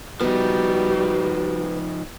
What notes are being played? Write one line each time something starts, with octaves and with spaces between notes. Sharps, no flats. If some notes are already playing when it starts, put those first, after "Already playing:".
F3 G3 B3 D#4 F#4